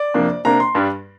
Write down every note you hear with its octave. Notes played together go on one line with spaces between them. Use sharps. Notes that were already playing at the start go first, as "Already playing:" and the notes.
Already playing: D5
F2 C3 A#3 D4
C3 A#3 D4 A#5
C6
G2 G3 D4